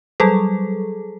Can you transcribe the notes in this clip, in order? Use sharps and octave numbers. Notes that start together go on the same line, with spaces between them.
F#3 G3 G#4 A4